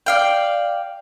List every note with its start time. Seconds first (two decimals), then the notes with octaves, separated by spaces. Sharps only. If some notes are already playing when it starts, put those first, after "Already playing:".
0.06 D5 F5 G5